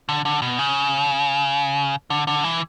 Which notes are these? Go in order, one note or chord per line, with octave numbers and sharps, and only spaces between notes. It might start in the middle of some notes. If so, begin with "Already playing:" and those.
D3
D3
B2
C#3
D3
D3
E3